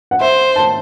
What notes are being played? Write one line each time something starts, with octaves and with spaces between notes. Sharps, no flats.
F#5
C5 E5
A5